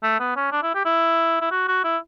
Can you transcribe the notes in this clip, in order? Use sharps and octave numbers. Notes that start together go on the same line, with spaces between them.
A3
B3
C#4
D4
E4
G4
E4
E4
F#4
F#4
E4